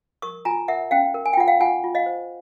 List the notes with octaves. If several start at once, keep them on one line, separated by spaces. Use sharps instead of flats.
A#4 C#6 D#6
F4 G#5 A#5
A#4 E5 F#5
C#4 F5 G5
A#4
G#5
G5
F4 F#5
F5 G5
F4 F#5 G#5
F4
D#5 F5
C5